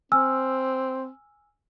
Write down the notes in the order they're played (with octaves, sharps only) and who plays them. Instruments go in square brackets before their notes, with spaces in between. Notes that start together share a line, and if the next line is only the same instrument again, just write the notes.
[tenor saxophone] C4 [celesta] G#5 E6 F6